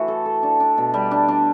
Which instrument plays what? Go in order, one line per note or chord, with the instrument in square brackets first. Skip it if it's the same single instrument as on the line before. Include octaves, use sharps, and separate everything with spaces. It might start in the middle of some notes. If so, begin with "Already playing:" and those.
Already playing: [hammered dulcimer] E3 A3 E4 F#4
A4
A4
D4
D4
B2
G3
D4
D4